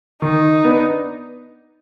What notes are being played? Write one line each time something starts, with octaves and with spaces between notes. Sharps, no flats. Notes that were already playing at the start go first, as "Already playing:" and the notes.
D#3 D#4
B3 D4